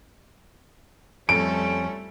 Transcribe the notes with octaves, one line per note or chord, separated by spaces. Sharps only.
F2 G3 A3 C#4 A4 D7